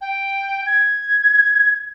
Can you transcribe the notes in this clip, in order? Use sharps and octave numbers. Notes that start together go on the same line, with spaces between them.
G5
G#6